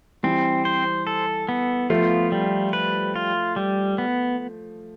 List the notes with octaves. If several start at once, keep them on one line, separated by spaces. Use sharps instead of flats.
E3 G3 C4
C5
A4
B3
F3 A3 F4
G3
B4
F4
G3
B3